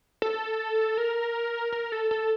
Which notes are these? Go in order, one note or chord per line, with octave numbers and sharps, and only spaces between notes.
A4
A#4
A#4
A4
A4